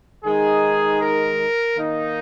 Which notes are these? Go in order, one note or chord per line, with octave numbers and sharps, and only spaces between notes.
D#3 G#3 D#4 G#4
A#4
D#3 A#3 D#4